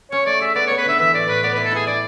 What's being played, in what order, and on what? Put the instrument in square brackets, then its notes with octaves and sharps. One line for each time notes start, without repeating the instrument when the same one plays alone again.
[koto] C#4 [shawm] C#5
[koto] A3 [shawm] D5
[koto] G#4 [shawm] E5
[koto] B3 [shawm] D5
[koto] B3 [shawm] C#5
[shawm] B4
[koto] D3 [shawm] E5
[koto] E3 [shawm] E5
[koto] A2 [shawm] D5
[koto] A2 [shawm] B4
[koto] B3 [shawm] D5
[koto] E4 [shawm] B4
[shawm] A4
[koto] E4 [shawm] G#4
[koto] E4 [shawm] D5